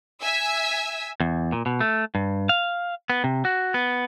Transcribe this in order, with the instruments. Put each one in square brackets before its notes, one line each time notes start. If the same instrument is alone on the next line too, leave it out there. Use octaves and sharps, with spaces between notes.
[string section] E5 G#5 E6
[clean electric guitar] E2
A#2
B2
A3
G2
F5
B3
C3
F#4
B3